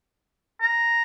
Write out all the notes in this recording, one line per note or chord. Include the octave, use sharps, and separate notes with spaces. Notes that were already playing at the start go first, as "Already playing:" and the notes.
A#5